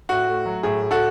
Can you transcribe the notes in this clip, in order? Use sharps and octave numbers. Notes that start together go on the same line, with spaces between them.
A2 F#4
A3
F#3
A2 G#4
A2
F#4 A4